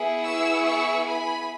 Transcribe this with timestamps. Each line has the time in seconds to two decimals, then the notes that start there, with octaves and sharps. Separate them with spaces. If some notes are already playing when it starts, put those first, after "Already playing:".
Already playing: B3 E4 G#4
0.24 C#6 E6
0.65 C#6 E6
1.06 G#5 B5